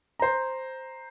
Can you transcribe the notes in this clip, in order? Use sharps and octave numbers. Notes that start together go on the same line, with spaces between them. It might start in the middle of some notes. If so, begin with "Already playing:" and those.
C5 A#5